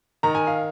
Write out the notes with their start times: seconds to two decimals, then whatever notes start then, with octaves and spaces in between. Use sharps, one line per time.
0.23 D#3 A#5
0.35 G#5
0.47 F5